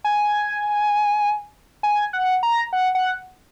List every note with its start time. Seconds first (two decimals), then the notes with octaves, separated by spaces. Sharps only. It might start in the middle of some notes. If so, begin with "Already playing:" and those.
0.04 G#5
1.83 G#5
2.13 F#5
2.43 A#5
2.73 F#5
2.95 F#5